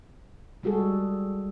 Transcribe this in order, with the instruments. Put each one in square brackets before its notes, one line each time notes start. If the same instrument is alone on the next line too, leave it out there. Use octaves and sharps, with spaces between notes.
[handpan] G3 G#3 F#4 G#4 A4